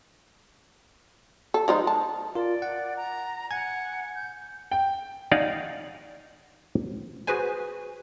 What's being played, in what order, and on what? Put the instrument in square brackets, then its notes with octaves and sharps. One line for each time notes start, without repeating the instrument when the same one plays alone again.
[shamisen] A4
F3 G#3 D#4
A5
[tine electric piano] F4 A#4 [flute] D5
[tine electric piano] F#5
[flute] A#5
[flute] F#5 [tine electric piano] G#5 G#6
[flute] G6
[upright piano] G5
[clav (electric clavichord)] D#4 D5 F5 F#5 G#5
[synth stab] F#4 G#4 B4 C5 G#5